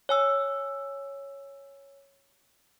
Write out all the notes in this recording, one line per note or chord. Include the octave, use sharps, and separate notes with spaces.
C#5 G#5 E6